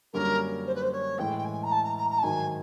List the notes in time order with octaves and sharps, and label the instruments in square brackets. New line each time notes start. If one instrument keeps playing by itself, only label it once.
[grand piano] F#2 D3 G3 A#3 C#4 [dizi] A#4
[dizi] C5
B4
C5
C#5
[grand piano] A2 E3 G#3 [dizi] G5
[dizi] G5
G#5
A#5
A5
A#5
A#5
A#5
A5
[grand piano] G#2 D#3 F#3 [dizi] G#5